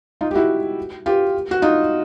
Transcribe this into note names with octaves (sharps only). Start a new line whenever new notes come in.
D#4 F4
G4
E4 F#4
F4 G4
F#4
D#4 F4